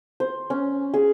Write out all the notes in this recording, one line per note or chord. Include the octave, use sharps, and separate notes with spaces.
C5
C#4
G#4